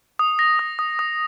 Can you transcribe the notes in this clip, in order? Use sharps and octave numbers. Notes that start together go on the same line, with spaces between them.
D#6
A#6
D#6
D#6
D#6